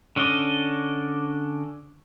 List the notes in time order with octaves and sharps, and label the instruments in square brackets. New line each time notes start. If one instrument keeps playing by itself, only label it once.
[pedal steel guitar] D3 C#4 D4 D#5